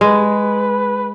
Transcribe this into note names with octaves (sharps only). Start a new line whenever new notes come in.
G#3 B4